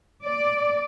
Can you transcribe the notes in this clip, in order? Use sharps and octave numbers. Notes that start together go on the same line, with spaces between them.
D5